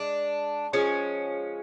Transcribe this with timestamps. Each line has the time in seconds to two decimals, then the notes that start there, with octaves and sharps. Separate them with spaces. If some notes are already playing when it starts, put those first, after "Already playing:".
Already playing: G#3 D4
0.73 F3 G#3 C#4